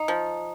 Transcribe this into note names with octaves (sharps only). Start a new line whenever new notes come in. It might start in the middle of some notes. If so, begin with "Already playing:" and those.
Already playing: D#4
F3